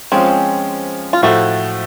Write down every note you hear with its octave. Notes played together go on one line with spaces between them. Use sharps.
F3 G#3 C4 C#4
F4
A2 F3 A3 F#4